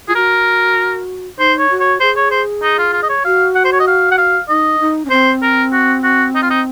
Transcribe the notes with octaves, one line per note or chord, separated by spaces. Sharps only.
F4 G#4
F#4 A#4
D#4 C5
C#5
F#4
C#5
G#4 C5
C#5
C5
D#4
F4
F4
D#5
C#5
F#4 F5
F#5
C5
C#5
D#5
F5
F#5
F5
D#4 D#5
D#4
C#4
C4 C5
A#4
F#4
F#4
D#4
F4
D#4